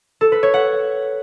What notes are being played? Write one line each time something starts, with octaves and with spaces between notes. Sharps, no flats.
A4
B4
C#5
F#5